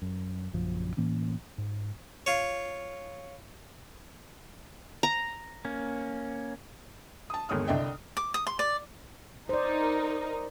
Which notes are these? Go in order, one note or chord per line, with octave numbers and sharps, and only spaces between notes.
F#2
A#1 F#2 C#3 F3
A2 E3 A#3 C#4
G#2
F4 C#5
A#5
A#3 C#4
A5 D#6
G1 D#2 G#3 C#5 D#6 F6
C2 D3 D4 D#5 E5 G5
D6
D#6
C6
D5
D#4 A#4 C5 D5